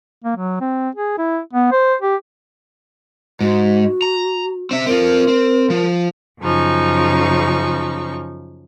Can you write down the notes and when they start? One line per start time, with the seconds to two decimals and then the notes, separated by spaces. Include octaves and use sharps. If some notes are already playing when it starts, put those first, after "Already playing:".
0.24 A#3
0.36 F#3
0.60 C4
0.95 G#4
1.18 E4
1.53 B3
1.72 C5
2.01 G4
3.41 G#2 F#4
4.02 A#5
4.71 C4 E5
4.86 C4 F4 A#4
5.28 C4
5.70 F3
6.41 F#2 C#3 F3 D#4 C#6